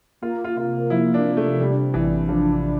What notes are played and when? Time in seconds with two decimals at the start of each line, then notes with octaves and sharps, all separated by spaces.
0.22 A#3 F4
0.44 F4
0.56 C3 F4
0.90 F3 E4
1.14 D4
1.25 C3
1.37 A3
1.59 G3 D4
1.94 A1 E3
2.28 F3 D4